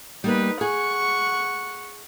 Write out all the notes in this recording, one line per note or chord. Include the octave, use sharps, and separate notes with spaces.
G3 A#3 B3 D#4 B4
G#4 F#5 C#6